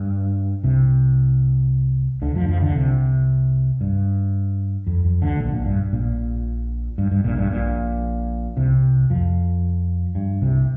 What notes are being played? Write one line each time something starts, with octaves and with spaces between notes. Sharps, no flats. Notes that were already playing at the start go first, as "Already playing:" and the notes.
Already playing: G2
C2 C3
D2 D3
F2 F3
F2 F3
D2 D3
C2 C3
G2
F2
F2
D2 D3
A#1 A#2
A#1 A#2
G2
A#1 A#2
G2
G2
A#1 A#2
G2
A#1 A#2
C2 C3
F2 F3
G2
C2 C3